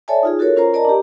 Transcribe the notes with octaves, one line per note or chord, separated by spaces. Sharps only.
A4 C#5 D5 E5 G#5 A5
D#4 F4 G#4
F#4 A4 A#4 C#5
C#4 F4 A#4 C5 C#5 A#5
A#4 D5 D#5 A5 A#5
D4 G4